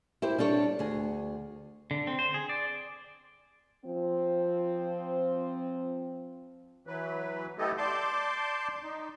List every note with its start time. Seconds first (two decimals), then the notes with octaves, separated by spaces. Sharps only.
0.22 E4 G4 C5
0.38 G3 D4 A4 C#5
0.79 D2 G#4
1.91 D3
2.07 C4
2.19 C5
2.34 G#4
2.49 D5
3.85 F3 C4
6.87 E3 F#3 B4
7.58 A3 B3 E4 G4 A4 D#5
7.78 D5 A5 C6 D6 G6
8.84 D#4